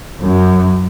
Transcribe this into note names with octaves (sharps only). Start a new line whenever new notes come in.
F#2